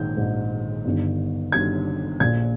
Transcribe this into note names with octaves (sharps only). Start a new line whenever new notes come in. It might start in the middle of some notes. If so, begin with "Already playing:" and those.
Already playing: A#1 G#2 D#3 G6
A#1 G#2 D#3
G1 G2 D#3
G1 G2 D#3 G#6
A#1 A#2 G#6